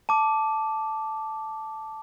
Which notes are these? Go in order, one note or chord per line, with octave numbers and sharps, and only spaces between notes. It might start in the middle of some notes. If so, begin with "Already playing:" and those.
A5 D6